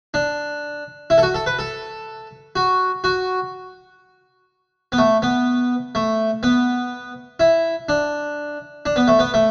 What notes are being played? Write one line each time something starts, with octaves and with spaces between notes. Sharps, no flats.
D4
E4
A4
F#4
A4
B4
A4
F#4
F#4
B3
A3
B3
A3
B3
E4
D4
D4
B3
A3
B3
A3